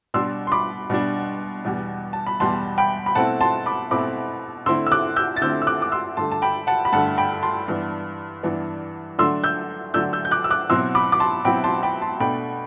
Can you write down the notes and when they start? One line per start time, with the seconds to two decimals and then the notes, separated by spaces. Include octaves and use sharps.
0.14 B2 G3 D4 C6 E6
0.47 C6
0.52 B5 D6
0.90 B2 G3 D4
1.65 E2 B2 G3
2.13 A5
2.27 B5
2.40 E2 B2 G3 A5 C6
2.78 G5 B5
3.06 B5
3.15 B2 A3 C4 E4 F#5 A5
3.41 A5 C6
3.66 B5 D6
3.91 B2 A3 C4 E4 B5 D6
4.66 D3 A3 C4 E4 C6 E6
4.86 E6
4.92 D6 F#6
5.16 E6 G6
5.36 A6
5.41 D3 A3 C4 E4 E6 G6
5.62 E6
5.67 D6 F#6
5.82 D6
5.92 C6 E6
6.17 G2 D3 A3 A5 C6
6.32 A5
6.42 G5 B5
6.67 F#5 A5
6.85 B5
6.93 G2 D3 A3 F#5 A5
7.18 G5 B5
7.43 A5 C6
7.68 G2 E3 B3 D4
8.43 G2 E3 B3 D4
9.19 D3 F#3 A3 D4 C6 E6
9.44 E6 G6
9.94 D3 F#3 A3 D4 E6 G6
10.13 E6 G6
10.25 G6
10.31 D6 F#6
10.44 E6
10.51 D6 F#6
10.70 B2 F#3 C4 E4 C6 E6
10.95 B5 D6
11.12 D6
11.20 A5 C6
11.45 B2 F#3 C4 E4 G5 B5
11.64 A5 C6
11.83 G5 B5
12.02 A5 C6
12.20 B2 A3 D4 G5 B5